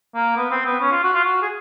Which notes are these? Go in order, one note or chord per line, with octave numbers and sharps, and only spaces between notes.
A#3
B3
C4
B3
C#4
F4
F#4
F4
F#4
G#4